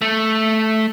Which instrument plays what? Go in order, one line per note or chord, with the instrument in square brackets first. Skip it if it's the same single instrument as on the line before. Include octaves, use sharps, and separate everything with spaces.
[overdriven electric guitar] A3